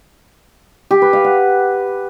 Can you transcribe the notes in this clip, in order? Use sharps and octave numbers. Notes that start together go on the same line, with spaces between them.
G4
B4
F5
F#5